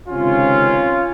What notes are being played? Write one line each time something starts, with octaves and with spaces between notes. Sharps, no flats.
C#2 C3 D#3 C#4 F4